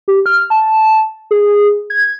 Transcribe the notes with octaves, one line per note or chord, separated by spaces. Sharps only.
G4
F6
A5
G#4
G#6